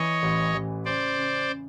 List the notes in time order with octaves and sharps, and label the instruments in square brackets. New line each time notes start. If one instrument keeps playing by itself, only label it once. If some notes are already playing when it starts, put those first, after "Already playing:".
Already playing: [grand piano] E3 [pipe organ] C#5 D#5
[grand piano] A1
A1
[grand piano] C#3 [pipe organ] C5 D5
[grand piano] C#3
C#3